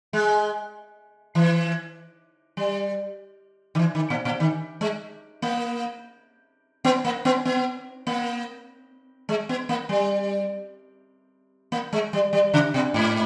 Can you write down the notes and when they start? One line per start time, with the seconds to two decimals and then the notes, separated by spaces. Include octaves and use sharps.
0.13 G#3
1.35 E3
2.57 G3
3.75 D#3
3.79 E3
3.95 D#3
4.10 A#2
4.25 A#2
4.40 D#3
4.81 G#3
5.42 A#3
6.85 B3
7.05 A#3
7.25 B3
7.45 B3
8.07 A#3
9.29 G#3
9.49 B3
9.69 A#3
9.89 G3
11.72 A#3
11.93 G#3
12.13 G3
12.33 G3
12.54 C#3
12.74 B2
12.94 G#2